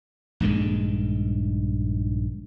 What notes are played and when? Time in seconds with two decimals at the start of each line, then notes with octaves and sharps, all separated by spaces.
0.40 A#1 G2 D#3 G#3